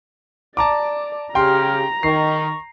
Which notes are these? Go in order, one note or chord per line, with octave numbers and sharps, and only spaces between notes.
D5 A5 A#5 D6
C#3 G4 G5 A#5 C6 F6
D#3 C#6 C7